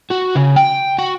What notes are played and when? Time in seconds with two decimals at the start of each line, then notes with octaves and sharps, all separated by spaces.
0.10 F#4
0.35 C#3
0.56 G5
0.99 F#4